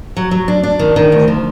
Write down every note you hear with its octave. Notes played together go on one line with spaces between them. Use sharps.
F#3
F#3
D4
D4
D#3
D#3
D2
F3